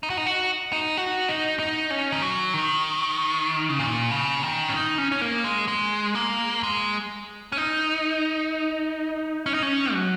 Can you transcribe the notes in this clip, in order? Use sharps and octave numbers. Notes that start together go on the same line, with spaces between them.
D#4
F#4
D#4
F#4
D#4
F#4
D#4
D#4
C#4
D#3
F#3
D#3
C#3
A#2
C#3
D#3
C#4
D#4
C#4
C#4
A#3
G#3
G#3
A#3
G#3
C#4
D#4
C#4
D#4
C#4
F#3